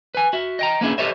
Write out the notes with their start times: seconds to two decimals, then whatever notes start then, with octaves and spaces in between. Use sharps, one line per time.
0.15 B4 G#5
0.33 F#4 E5
0.59 D#5 G5 A#5
0.81 A#3 B3 C#4 D4 E4 G#4
0.98 G4 A4 B4 C#5 D#5 E5